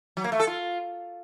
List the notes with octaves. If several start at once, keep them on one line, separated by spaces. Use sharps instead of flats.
F#3
A#3
A3
A4
F4